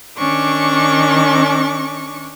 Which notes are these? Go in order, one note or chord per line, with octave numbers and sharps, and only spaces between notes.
D#3 C#4 D4 C#6 D6